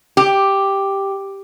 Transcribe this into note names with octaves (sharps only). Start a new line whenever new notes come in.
G4